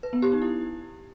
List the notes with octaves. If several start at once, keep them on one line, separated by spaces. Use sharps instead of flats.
B4
B3
G4
D#4
E4